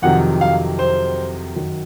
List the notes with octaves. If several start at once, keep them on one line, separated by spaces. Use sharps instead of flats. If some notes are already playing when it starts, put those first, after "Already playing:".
F2 C3 D#3 F#3 F#5
F5
C5
F#2 D#3 F#3